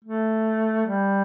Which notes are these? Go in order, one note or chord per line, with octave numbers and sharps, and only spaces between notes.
A3
G3